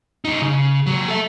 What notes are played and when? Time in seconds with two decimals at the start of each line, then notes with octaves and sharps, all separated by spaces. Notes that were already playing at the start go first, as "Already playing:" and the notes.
0.25 F#2 D#4
0.42 C#3
0.86 C#2 F#3
1.08 A4 E5